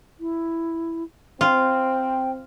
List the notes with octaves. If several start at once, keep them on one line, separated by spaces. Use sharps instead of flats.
E4
C4 F4 G5